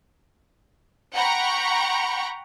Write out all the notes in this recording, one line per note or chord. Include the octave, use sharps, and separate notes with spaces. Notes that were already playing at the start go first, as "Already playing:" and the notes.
F#5 G5 A#5 B5 C#6